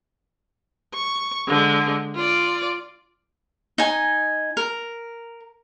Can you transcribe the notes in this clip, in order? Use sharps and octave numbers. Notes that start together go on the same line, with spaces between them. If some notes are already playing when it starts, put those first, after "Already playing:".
C#6
D3 G#3
F4 D5
D#4 G#5
A#4